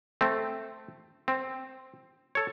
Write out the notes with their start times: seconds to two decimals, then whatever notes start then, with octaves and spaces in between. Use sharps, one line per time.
0.21 A3 C4
1.28 C4
2.35 A4 C#5